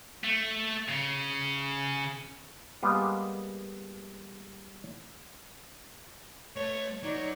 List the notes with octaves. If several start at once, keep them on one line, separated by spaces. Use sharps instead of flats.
A3
C#3
G3 G#3 A#3 B3 F4
A3 C#5
F#3 D#4 C#5 D5